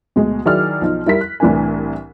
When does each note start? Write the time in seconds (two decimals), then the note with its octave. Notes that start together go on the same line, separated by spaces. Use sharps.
0.16 D2 B2 G#3
0.45 D#3 F#3 E4 G#4 D5 F6
0.81 B1 F3 D#4
1.06 G3 E4 A#4 B6
1.21 F#6
1.40 C2 A2 E3 D4 A#4 G#5